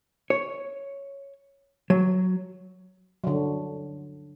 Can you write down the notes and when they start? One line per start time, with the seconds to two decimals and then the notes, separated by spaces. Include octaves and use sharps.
0.30 C#5
1.90 F#3
3.24 D3 F#3